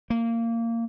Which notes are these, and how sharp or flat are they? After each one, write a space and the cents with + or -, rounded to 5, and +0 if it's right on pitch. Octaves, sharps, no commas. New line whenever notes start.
A#3 -20